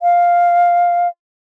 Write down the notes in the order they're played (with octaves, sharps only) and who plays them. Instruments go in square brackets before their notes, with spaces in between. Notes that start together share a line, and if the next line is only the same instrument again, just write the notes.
[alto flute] F5